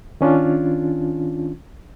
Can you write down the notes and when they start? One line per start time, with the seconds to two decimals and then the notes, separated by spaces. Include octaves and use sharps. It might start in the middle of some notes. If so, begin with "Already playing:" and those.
0.21 D#3 C#4 D4 F4